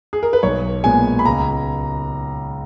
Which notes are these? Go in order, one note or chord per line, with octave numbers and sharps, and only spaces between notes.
G#4
A#4
B4
B1 C#5
A#2 G#3 B3 G#5
B5
C#2 A#5